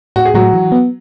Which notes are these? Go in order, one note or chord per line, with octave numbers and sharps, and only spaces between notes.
A2 F#4
G#4
A2 F#3 F#4
E3
B3